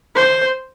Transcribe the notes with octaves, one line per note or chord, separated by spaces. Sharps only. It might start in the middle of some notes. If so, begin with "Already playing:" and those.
C5